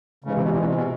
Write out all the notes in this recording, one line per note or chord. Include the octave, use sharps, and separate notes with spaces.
G#2 C#3 E3 G#3
C3
B2
A#2
B2
C3
B2